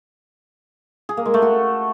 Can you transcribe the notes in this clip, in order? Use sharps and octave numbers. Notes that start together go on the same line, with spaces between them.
G#4
A#3
G#3
A3
F#4